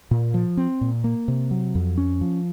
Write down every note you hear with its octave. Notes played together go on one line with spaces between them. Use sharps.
A#2
F3
C4
A#2
A#3
C3
F#3
F2
C#4
F3